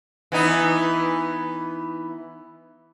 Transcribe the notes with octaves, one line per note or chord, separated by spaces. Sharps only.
E3 B3 D#4